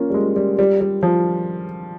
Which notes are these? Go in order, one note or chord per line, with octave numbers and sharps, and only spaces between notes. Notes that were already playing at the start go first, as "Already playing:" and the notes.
Already playing: A#3 C#4 F4
G3
G#3
G3
G3
G3
F3